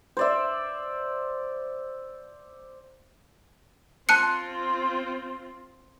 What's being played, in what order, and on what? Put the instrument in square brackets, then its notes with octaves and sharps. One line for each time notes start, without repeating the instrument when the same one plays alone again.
[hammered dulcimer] C5 D5 E5
[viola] C4 F4 [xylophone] A5 F#6 C#7